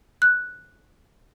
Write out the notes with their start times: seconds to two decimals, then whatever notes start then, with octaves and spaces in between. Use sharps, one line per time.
0.22 F#6